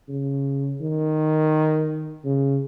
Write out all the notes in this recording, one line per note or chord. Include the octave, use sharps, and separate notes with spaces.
C#3
D#3
C#3